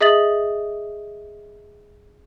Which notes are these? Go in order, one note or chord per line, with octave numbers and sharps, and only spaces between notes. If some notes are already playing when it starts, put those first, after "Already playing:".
G#4 D#5 E5 D#6 A6 F#7